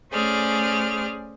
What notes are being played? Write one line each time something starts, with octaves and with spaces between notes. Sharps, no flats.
A3 C#4 G#4 C5 D5 F6